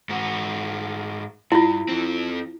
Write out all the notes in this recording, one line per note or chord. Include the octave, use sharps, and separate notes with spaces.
G#2 F#4
G2 E4 F4
F2 C4